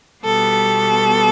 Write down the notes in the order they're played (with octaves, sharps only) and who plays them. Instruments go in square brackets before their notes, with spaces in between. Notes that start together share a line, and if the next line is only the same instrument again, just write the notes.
[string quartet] B2 G3 B3 A4